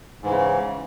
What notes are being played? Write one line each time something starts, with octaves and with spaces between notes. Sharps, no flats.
G#2 C#3 E3